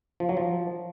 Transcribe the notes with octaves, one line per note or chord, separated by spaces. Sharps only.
F3
F#3
F3